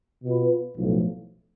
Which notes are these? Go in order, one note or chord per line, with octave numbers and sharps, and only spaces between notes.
B2 B3 F4 B4
B1 A2 F3